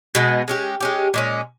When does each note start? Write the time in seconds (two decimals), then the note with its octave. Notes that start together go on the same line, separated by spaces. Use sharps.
0.15 B2 G#3 B3
0.48 G#3 C#4 G4
0.81 G#3 C#4 G4
1.14 A#2 G#3 C#4